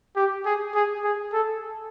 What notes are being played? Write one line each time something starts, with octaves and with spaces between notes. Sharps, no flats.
G4
G#4
G#4
G#4
A4